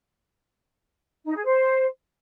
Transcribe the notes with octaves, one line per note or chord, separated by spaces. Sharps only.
D#4
G#4
C5